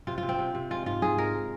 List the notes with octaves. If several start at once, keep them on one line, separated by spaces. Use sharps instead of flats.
C3 F4
F4
C3
C4
C3
C3
G#3 F4
G#2 F4
G#2 G#4
G#3 A#4